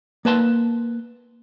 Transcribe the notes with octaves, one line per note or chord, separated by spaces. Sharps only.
A#3 B4 A5 C6